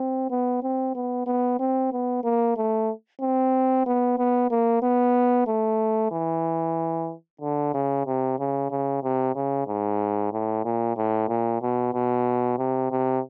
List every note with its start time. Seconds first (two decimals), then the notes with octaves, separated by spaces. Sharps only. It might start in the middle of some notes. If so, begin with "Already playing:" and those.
Already playing: C4
0.30 B3
0.63 C4
0.95 B3
1.27 B3
1.59 C4
1.92 B3
2.24 A#3
2.57 A3
3.21 C4
3.86 B3
4.18 B3
4.51 A#3
4.83 B3
5.47 A3
6.11 E3
7.41 D3
7.74 C#3
8.06 C3
8.39 C#3
8.71 C#3
9.03 C3
9.35 C#3
9.67 G#2
10.32 A2
10.65 A#2
10.97 A2
11.29 A#2
11.62 B2
11.94 B2
12.58 C3
12.91 C3